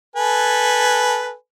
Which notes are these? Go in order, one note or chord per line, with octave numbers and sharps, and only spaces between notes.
A4 B4 G#5